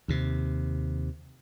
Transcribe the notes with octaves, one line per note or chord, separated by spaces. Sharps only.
D#2 C3